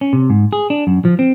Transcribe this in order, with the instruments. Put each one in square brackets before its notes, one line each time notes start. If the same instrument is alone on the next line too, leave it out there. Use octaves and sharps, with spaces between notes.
[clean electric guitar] C#4
C3
G#2
G#4
D4
F#2
F3
C4